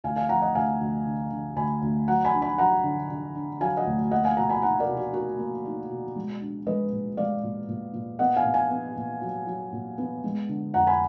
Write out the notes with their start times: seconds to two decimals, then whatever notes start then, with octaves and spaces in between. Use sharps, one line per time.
0.04 D2 F5 G#5
0.16 F5 G#5
0.29 F3 F#5 A#5
0.42 D#5 F#5
0.55 D2 F5 G#5
0.80 D2
1.06 D3
1.31 D3
1.56 D2 G#5 B5
1.82 D2
2.08 F#3 F#5 A#5
2.25 G#5 B5
2.33 D4
2.42 G#5 B5
2.58 F#3 F#5 A#5
2.84 D3
3.10 D3
3.35 D4
3.61 F#3 F5 G#5
3.77 D#5 F#5
3.86 D2
4.11 A#3 D#5 F#5
4.24 F5 G#5
4.37 B2 F#5 A#5
4.49 G#5 B5
4.62 D#4 F#5 A#5
4.80 A#4 D5
4.88 B2
4.97 F#4
5.13 D#4 F#4 A#4
5.39 A#3
5.65 D#4
5.90 B2
6.16 G#3
6.41 D4
6.67 G#3 B4 D#5
6.92 A#2
7.17 G#3 D5 F5
7.43 A#2
7.69 A#2
7.93 A#2
8.19 B3 D#5 F#5
8.37 F5 G#5
8.45 A#2
8.54 F5 G#5
8.70 B3
8.97 A#2
9.22 F#3
9.47 F#3
9.73 A#2
9.98 B3
10.24 G#3
10.49 D3
10.74 F2 F#5 A#5
10.87 G#5 B5